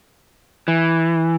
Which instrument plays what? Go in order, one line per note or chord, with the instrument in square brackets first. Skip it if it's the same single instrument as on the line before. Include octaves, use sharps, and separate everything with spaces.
[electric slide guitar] E3